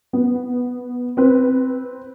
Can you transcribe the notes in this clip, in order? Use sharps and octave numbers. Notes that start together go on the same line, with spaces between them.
B3
C4 B4